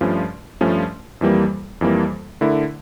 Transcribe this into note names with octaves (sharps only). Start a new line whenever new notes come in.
G2 F3 A3 C#4
G2 F3 A3 C#4
F2 E3 G3 A#3
F2 E3 G3 A#3
D3 A3 E4 A#4